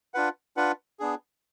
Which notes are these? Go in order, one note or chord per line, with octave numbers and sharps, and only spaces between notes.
D4 F4 B4 F#5
D4 F4 B4 F#5
B3 D4 G#4